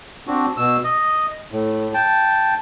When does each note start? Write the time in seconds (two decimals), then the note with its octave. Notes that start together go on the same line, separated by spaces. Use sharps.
0.27 C4 D4 F#4
0.57 B2 E6
0.84 D#5
1.52 A2
1.94 G5 A5